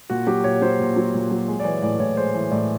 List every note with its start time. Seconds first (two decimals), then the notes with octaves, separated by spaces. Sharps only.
0.10 A#2 F#4
0.27 F#3 G4
0.44 A#2 C#5
0.62 F#3 C5
0.80 A#2
0.96 F#3
1.14 A#2
1.31 F#3
1.48 G#3
1.59 D5
1.65 E3 C#5
1.82 A2 D5
2.00 A2 C#5
2.17 G#3 C5
2.34 E3
2.51 A2 D5